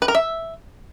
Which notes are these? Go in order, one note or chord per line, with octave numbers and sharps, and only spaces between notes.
B4
A#4
E5